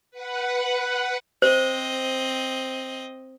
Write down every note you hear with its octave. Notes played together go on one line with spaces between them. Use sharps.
B4 F#5
C4 C5 D#5